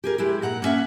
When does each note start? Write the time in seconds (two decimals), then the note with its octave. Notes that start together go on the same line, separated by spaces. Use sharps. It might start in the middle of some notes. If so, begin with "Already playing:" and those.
0.04 G4 G#4 A#4
0.18 G#3 E4 G4
0.42 A#2 F#5 A#5
0.62 A#3 B3 C#4 E5 F#5